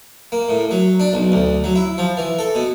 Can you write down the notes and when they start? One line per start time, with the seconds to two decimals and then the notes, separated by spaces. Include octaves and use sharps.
0.32 A#3
0.49 A2
0.71 F#3
1.00 D4
1.13 B1
1.32 D2
1.64 F#3
1.76 E4
1.98 F3
2.17 E3
2.39 A4
2.55 B2